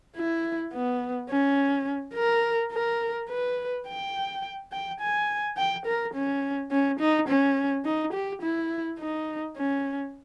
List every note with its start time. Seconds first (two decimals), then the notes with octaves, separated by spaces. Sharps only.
0.17 E4
0.73 B3
1.29 C#4
2.15 A#4
2.73 A#4
3.30 B4
3.87 G5
4.72 G5
5.00 G#5
5.57 G5
5.86 A#4
6.14 C#4
6.71 C#4
7.00 D#4
7.29 C#4
7.85 D#4
8.13 G4
8.42 E4
8.99 D#4
9.57 C#4